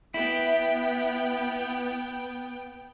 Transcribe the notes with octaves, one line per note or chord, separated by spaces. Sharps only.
B3 E4 G5